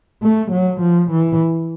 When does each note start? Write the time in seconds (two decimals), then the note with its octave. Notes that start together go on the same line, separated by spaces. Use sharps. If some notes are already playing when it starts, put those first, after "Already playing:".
0.23 A3
0.52 F#3
0.81 F3
1.11 E3